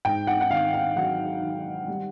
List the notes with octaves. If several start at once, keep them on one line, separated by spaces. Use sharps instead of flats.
G#2 G5
F#5
F#5
D#3 F5
F5
F#3 F#5
D#3
G3